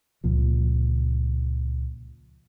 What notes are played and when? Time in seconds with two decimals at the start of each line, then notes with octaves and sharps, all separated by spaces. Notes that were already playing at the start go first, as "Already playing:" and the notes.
0.24 C#2 A#2 F3